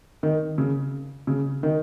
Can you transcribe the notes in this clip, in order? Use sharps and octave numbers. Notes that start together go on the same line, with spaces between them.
D#3
C#3
C#3
D#3